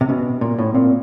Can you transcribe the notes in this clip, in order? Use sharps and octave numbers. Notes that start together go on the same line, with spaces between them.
C3
B2 C#4
A#2
A2
A#2 C4